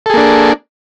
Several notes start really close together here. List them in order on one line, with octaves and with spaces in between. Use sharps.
A4 G#4 A#3 D4